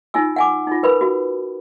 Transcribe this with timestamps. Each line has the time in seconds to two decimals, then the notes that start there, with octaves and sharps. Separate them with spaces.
0.14 D#4 F4 G#5 E6
0.36 F#5 G#5 D6
0.67 D#4 F4
0.83 A#4 B4 B5
1.01 F#4